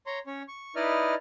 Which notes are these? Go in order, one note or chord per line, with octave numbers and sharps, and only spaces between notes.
C#5 A#5 C6
C#4 C#5
C#6
D#4 E4 B4 D5 D#5 F6